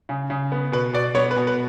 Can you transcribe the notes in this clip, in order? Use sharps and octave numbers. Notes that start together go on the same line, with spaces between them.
C#3
C#3
B3
B2 B4
B2 D5
B3 C#5
B4
B2
B4